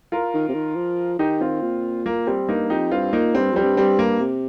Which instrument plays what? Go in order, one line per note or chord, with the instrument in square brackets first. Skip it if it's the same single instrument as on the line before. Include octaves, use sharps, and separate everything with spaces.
[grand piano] F4 A#4
[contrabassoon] D#3
C3
D#3
F3
[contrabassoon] D#3 [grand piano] D#4 G4
[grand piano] C4 F4
[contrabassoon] A#2
[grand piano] A#3
G3 C4
[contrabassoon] G2 [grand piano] A#3 D#4
[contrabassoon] F2 [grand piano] D#4 G4
[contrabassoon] G2 [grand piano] C4 F4
[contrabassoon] A#2 [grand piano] A#3 D#4
[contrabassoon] G2 [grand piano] G3 C4
[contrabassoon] F2 [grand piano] G3 C4
[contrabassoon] G2
[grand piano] G3 C4
A#3
[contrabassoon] C3